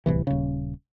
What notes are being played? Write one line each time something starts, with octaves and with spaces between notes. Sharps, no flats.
D1 C2 E3
D#1 C#3